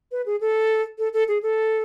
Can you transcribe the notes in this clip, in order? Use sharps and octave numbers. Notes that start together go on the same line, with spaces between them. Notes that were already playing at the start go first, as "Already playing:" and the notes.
B4
G#4
A4
A4
A4
G#4
A4